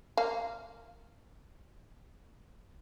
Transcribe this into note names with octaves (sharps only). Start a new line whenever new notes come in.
A#3 F5